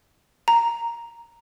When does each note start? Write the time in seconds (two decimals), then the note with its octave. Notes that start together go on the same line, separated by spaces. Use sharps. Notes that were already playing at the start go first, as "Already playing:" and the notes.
0.48 A#5